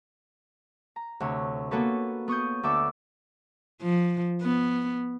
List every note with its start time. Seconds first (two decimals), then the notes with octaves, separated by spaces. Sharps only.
0.96 A#5
1.20 D2 C3 C#5
1.71 A#3 B3 F#4 A4 B4 C#5
2.28 B3 C#6 D#6 G6
2.63 D2 A4 E5 D6
3.82 F3
4.42 B3